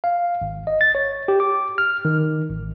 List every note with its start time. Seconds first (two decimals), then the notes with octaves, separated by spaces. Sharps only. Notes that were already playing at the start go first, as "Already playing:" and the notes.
0.04 F5
0.42 G#1
0.67 D#5
0.81 A6
0.95 C#5
1.28 G4
1.40 D6
1.78 F6
2.05 D#3
2.50 A1